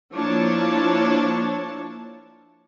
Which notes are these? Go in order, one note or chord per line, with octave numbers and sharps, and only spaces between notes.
F3 A#3 D4 E4 C#5 A5